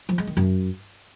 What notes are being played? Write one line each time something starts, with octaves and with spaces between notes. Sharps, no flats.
F3
G#3
D#3
F#2